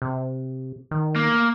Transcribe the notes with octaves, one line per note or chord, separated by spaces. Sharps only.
C3
D#3
A#3